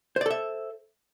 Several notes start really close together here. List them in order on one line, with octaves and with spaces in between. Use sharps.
C5 D5 A4 E5